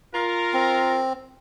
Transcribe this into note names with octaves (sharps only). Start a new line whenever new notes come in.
F4 A#4
C4